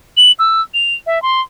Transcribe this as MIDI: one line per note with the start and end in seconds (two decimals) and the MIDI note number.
0.17 0.32 102
0.39 0.61 88
0.74 0.94 101
1.06 1.21 76
1.22 1.41 84